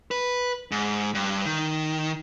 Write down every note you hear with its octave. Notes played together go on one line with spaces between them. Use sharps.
B4
G#2
G2
D#3